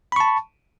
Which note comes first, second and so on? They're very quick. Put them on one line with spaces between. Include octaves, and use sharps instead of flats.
B5 C#6 A5